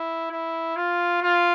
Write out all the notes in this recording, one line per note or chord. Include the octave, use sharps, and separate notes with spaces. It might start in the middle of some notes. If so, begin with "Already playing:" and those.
Already playing: E4
E4
F4
F4